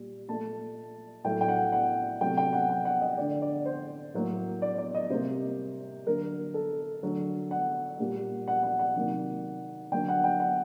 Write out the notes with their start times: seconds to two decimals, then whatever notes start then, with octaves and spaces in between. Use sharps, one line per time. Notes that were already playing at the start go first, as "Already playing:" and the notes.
Already playing: A#2 G3
0.28 A#2 A3 A5
1.24 A2 F#3 A3 G5
1.41 G5
1.48 F#5
1.72 F#5
2.21 C3 F#3 A3 G5
2.37 G5
2.53 F#5
2.70 G5
2.85 F#5
3.01 D#5
3.18 D3 A3 D5
3.42 D5
3.65 C5
4.14 A2 F#3 A#3
4.62 D5
4.78 D5
4.94 D#5
5.10 C3 G3 A#3 C5
6.06 D3 F#3 A#3 A#4
6.54 A4
7.02 D3 F#3 A3
7.51 F#5
7.99 A#2 G3 A#3
8.48 F#5
8.63 F#5
8.79 F#5
8.96 C3 D#3 F#3 A#3
9.92 D3 F#3 A#3 G5
10.08 F#5
10.24 G5
10.40 F#5